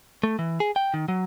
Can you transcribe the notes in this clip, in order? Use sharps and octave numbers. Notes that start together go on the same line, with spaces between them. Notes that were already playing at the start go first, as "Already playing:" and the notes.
A3
E3
G#4
G5
D#3
F#3